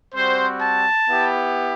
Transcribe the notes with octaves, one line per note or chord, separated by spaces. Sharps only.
G3 C4 F#4 C5
A5
B3 E4 G4